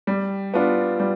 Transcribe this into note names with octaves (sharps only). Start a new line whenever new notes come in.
G3
B3 D4 F4
G3